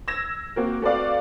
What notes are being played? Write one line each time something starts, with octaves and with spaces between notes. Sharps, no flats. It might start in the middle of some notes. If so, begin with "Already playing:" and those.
E6 G#6 A#6 E7
A#3 C4 F#4 A#4
A3 C4 F#4 B4 D5 F5